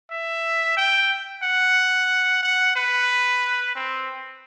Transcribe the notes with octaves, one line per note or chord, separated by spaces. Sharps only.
E5
G5
F#5
F#5
B4
C4